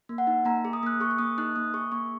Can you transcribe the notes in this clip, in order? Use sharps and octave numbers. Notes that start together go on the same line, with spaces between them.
A#3
F#5
D#4
A#3 A#5
G#4
D#6
A#3 F#6
G#4 C#6
C#6
A#3 D#6
D#4 F#6
A#3 D#6
G#4 C#6
A#3 C#6